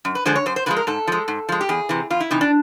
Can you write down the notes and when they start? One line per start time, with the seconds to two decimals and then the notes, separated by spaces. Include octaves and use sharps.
0.05 F#2
0.15 B4
0.25 D3 F3 G#3 C5
0.36 C#5
0.46 F#2 C5
0.56 C5
0.66 D3 F3 G#3 B4
0.77 A#4
0.87 G#2 A4
1.07 F3 G#3
1.28 G#2
1.49 F3 G#3
1.61 G4
1.69 E2 G#4
1.89 C3 E3
2.10 E2 F4
2.20 E4
2.31 C3 E3 D#4
2.41 D4